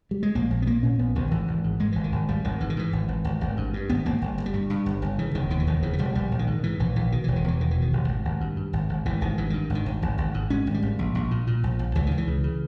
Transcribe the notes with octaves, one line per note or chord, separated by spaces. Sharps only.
G3
G#3
A#1 A#3
A#1
B3
A#2 A#3
A#2 C#4
A#1 B3
A#1 D#3
G#1 E3
G#1
G#2
G#2 G#3
G#1 E3
D#3
G#1
G#1 G3
G#1 D#3
G#2 E3
D#3
G#2 E3
G#1
G#1
G#1
G#1
G2
G2
G#1 B3
G#1 A#3
G1
G1
G3
G2
G2
G1
G1
C#3 E3
E1 D#3
D#2 D#3
E3
E1 D#3
C#3 E3
E3
E1 G3
A#1 G3
A#1
D#3
G#2
G#2 E3
A#1 E3
A#1 E3
B2 D#3
E1 E3
D#3
E2 E3
E1 D#3
E3
B2
D#3
E1
G#1
G#1
G2
G2
G#1
G#1
G#1 E3
G#1 D#3
G2 E3
G2 D#3
G#1
D#3
G#1
G#1
G#1
G#2
G#2 C#4
G#1
G3
G#1
A#1
A#1
A#2
A#2
A#1
A#1
C#2 E3
C#2 D#3
E3
C#3
C#3